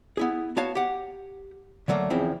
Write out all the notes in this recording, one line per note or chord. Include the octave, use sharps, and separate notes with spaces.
B3 E4 G#4
B3 F#4 C#5 F5 A5
G4 F#5
D3 F#3 A3 A#3
E2 C#3 F3 C4 E4